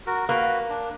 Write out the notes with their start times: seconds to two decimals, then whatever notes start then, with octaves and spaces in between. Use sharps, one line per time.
0.07 F#4 A#4
0.29 A#3 F#4 B4
0.69 D4